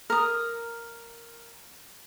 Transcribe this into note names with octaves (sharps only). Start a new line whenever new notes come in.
A#4 D#6